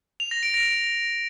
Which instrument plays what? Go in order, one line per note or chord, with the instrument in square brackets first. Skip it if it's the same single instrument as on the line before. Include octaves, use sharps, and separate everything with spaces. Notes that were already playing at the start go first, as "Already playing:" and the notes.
[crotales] F7
A#6
D7
A#6